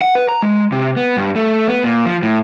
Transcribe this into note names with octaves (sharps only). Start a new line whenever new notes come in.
F#5
B4
A#5
G#3
C3
B3
G2
A3
B3
A#2
F3
A2